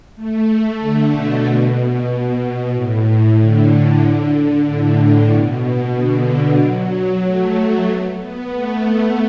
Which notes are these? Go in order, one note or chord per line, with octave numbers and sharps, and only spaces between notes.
A3
D3
B2
A2
D3
D3
A2
B2
D3
F#3
A3
B3
B3
A3